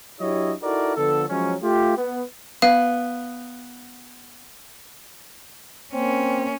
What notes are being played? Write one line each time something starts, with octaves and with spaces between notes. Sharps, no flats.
F#3 D4 E4 G4 C#5 D#5
D#4 E4 F#4 A4 A#4 D5
D3 F3 B3 A4
F3 F#3 G#3 C#4
A3 F4 G4
B3
B3 F5
A#3 C4 C#4